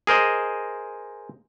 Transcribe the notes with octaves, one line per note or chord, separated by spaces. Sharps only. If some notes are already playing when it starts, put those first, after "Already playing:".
G#4 A#4 C5 D#5